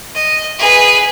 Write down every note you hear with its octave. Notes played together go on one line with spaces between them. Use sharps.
D#5
G#4 B4